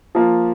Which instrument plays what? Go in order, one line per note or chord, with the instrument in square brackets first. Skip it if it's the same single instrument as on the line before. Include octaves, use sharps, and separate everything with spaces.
[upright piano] F3 A#3 F4